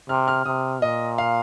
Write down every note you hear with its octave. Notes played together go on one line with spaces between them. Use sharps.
C3 F6
F6
C3 D#6
A#2 D#5
F5